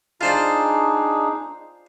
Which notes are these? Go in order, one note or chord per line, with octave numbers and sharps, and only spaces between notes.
D4 D#4 F4 G#4 C5 D5